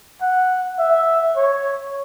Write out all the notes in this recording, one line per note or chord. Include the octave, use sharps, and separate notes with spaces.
F#5
E5
C#5